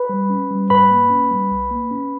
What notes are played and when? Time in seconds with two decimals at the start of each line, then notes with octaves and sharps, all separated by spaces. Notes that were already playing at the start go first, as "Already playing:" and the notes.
Already playing: B4 B5
0.09 G3
0.30 C#4
0.51 G3
0.70 G#2 B4 B5
0.90 A#3
1.10 C#4
1.31 G3
1.51 B1
1.71 A#3
1.91 C#4